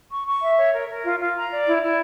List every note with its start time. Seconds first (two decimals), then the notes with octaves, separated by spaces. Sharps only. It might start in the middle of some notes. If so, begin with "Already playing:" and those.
0.11 C#6
0.27 C#6
0.41 E5
0.57 C#5
0.73 A#4
0.89 A#4
1.03 F4
1.19 F4
1.35 A#5
1.50 D5
1.66 E4
1.81 E4